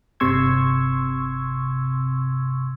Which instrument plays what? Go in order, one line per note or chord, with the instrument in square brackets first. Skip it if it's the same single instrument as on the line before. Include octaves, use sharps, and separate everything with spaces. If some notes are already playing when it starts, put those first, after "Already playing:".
[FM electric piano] G1 C3 C6 C#6 E6 G#6